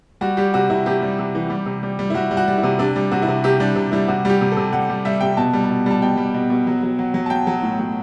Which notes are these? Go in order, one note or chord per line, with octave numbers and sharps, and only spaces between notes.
G3 F#4
G3 G4
C3 F#4
C3 E4
C3 G4
G3
C3
E3
G3
C3
G3
G3
E4
G3 F#4
G3
F#4
G3
E4
C3
C3 D4
G3
C3 F#4
E4
C3
C3 G4
G3 D4
C3
G3 E4
C3 F#4
G3 G4
C3
A4
C3
G3 F#5
G3
G3 E5
C3 G5
B2 A5
G3
A5
B2
G3 A5
B2 G5
G3
B2
B2
F#3
F#3
F#3
F#3
A5
F#3 G5
F#3
A2
F#3